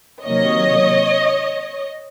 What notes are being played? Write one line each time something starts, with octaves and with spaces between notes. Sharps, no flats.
C3 D#3 F#3 A#3 C#5 D#5